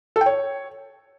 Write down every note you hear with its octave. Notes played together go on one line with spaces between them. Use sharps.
A4
G5
C#5